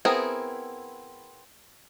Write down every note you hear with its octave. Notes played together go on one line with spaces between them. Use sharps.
B3 C4 E4 G#4 A#4